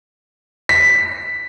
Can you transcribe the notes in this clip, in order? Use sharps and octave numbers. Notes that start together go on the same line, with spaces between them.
B6